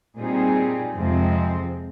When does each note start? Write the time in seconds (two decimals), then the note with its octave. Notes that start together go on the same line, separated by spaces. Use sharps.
0.17 A#2 G3 C4 D#4 G#4
0.94 F2 C3 F3 G#3 C4